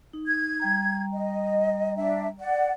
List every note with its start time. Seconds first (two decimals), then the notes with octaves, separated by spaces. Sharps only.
0.13 D#4
0.26 G#6
0.60 G3 G5 A#5
1.13 D#5
1.96 D4 E5
2.39 D5 F#5